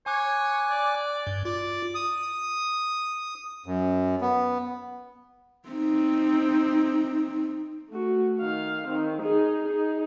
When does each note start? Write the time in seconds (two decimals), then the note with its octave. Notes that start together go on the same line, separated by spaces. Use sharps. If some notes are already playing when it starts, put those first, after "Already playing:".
0.06 C#5 G#5 D6 F#6
0.70 D5
1.27 G2
1.45 F4 D5
1.95 D#6
3.66 F#2
4.21 B3
5.68 C4 D#4
7.90 A3 F#4
8.39 D#3 F5
8.88 D#3 C4
9.21 D#4 G#4
9.66 D#4 G#4